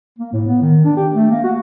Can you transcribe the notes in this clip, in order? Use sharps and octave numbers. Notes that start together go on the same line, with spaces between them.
A#3
A2
B3
D#3
D4
G4
A3
A#3
F#4